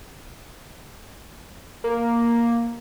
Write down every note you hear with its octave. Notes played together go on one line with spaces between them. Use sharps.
A#3